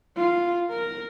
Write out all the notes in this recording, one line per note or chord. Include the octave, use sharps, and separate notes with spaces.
F4
A#4